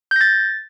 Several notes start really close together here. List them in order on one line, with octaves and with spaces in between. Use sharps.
G6 A#6 A6